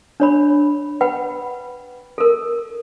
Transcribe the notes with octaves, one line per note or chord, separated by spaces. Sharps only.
D4 C#5 B5
B4 F#5 G5 B5
A4 A#4